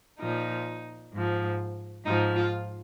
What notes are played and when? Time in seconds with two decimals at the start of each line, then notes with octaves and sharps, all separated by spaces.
0.20 A#2 F3 D#4
1.13 G#2 F3
2.05 G#2 F3 D#4
2.35 F4